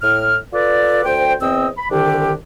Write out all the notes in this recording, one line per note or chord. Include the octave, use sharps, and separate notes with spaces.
A2 F6
F4 A4 B4 D5
D2 C5 G5
E2 C4 C5 D#5 E6
B5
C2 D3 D#3 D4 G4